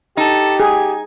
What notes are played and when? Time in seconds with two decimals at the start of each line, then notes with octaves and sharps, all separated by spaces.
0.17 D#4 G4 A4
0.60 G#4 G#5